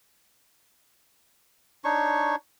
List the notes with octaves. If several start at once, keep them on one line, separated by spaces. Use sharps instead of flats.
D4 D#4 C#5 C#6